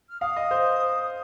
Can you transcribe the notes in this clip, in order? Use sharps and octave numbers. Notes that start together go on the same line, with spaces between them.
F6
F5 D#6
D#5
C5